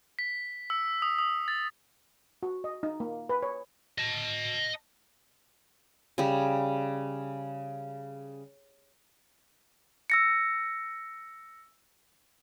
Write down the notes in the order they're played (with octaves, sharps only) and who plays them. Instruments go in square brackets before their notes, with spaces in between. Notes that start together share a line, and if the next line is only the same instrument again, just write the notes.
[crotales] B6
E6
D#6
D#6
A6
[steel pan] F#4
D#5
D#4
A#3
B4
C#5
[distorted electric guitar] D#5 A5
[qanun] C#3 G3
[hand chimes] E6 A#6 C#7